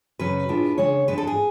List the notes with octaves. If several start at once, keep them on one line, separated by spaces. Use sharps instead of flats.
F#2 C#3 F#3 C#4 B4
A2 G#3 D4 F4
C#3 G#3 D4 C#5
G#2 G#3 D4 B4
A4
G#4